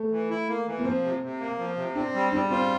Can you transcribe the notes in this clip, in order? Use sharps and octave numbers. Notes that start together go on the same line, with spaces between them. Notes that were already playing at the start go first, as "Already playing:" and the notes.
Already playing: A3
E3
E4
A#3
E3
A#3
F3 C4
C3
C3
A#3
F3
C3
C4 D4
G3
G3 D4
C4 F4